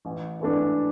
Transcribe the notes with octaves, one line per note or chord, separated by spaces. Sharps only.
A1
G#2 E3 A3 D4